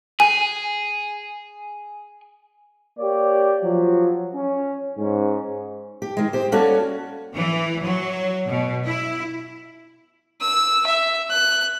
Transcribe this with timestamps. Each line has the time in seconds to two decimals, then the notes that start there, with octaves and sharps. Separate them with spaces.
0.20 G#4 G#5
2.99 A#3 G4 C#5 D5
3.63 F3 F#3
4.35 C#4
4.98 G#2 C#4
6.02 G4
6.17 D#3 G#3
6.33 G4 C5
6.52 G3 A#3 C#4 F#4 A4
7.35 E3
7.83 F#3
8.47 B2
8.85 E4
10.40 E6
10.86 E5
11.30 F#6